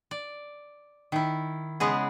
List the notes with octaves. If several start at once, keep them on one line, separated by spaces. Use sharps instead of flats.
D5
D#3 E4
C#3 G#3 B3 G#4